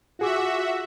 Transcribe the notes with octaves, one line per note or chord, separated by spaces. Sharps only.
F4 F#4 G#4 E5 D6